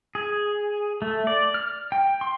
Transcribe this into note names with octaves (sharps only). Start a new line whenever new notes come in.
G#4
A3
D5
F6
G5
C6